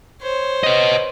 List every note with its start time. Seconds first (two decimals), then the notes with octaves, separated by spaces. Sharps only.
0.22 C5 C#5
0.64 B4 D#5